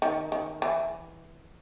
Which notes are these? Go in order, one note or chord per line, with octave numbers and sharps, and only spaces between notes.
D#3
D#3
E3